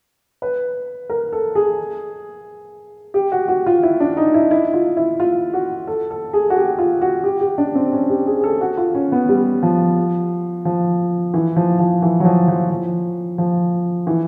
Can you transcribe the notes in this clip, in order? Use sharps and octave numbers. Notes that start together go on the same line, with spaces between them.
B4
A#4
A4
G#4
G4
F#4
F#4
F4
E4
D4
D#4
E4
E4
F4
E4
F4
F#4
A4
A4
G#4
F#4
G4
F4
F#4
G4
G4
D4
C4
C#4
G4
G#4
G#4
A4
F#4
F4
C#4
B3
G3
F3
F3
E3
F3
F3
E3
F#3
F3
F3
F3
F3
E3